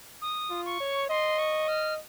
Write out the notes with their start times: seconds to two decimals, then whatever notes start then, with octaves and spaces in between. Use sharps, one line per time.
0.22 D#6
0.50 F4
0.66 C#6
0.80 C#5
1.09 D#5 C6
1.39 C#6
1.68 F6